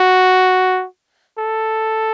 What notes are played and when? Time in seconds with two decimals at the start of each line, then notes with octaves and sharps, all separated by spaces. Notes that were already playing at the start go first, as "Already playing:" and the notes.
Already playing: F#4
1.38 A4